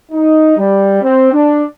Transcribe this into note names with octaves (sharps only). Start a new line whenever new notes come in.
D#4
G3
C4
D4